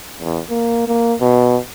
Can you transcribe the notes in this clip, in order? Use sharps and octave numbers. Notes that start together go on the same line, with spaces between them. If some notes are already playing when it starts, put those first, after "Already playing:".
E2
A#3
A#3
B2